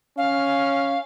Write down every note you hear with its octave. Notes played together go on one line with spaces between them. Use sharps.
C#4 F5